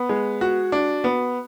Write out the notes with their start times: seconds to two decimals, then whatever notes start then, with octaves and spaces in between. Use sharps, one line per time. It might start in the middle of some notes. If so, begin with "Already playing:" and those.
Already playing: B3
0.09 G#3
0.41 F#4
0.72 D4
1.04 B3